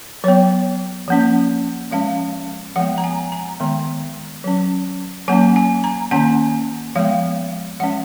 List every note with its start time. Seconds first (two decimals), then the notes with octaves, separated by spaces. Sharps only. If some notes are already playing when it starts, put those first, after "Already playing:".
0.24 F#3 B3 C#5
1.08 F3 A#3 C#4
1.91 F3 G#3 C#4 F5
2.76 F3 G#3 B3 F#5
2.98 A#5
3.04 G#5
3.32 A#5
3.60 D#3 G#3 B3
4.44 F#3 C#4
5.28 F#3 A#3 C#4 G#5
5.56 G#5
5.84 A#5
6.11 D#3 A#3 C#4 G#5
6.96 F3 G#3 B3 F5
7.80 F3 G#3 C#4 F#5